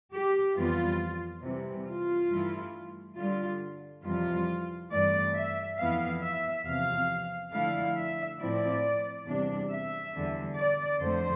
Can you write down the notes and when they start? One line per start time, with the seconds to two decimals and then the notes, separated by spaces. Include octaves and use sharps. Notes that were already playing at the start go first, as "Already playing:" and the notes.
0.12 G4
0.56 F2 E3 G3 B3 F4
1.43 C3 E3 G3
1.87 F4
2.30 G2 E3 A3 E4
3.17 D3 G3 D4 F4
4.04 F2 C3 E3 G3 F4
4.91 G2 E3 A3 C4 D5
5.35 E5
5.78 F2 E3 B3 E4 F5
6.21 E5
6.65 E2 C3 F3 F5
7.52 D3 F3 A3 E4 F5
7.96 E5
8.39 A2 F3 C4 E4 D5
9.26 E2 C3 G3 D4
9.70 E5
10.13 E2 D3 G3
10.57 D5
11.00 F2 D3 A3 C5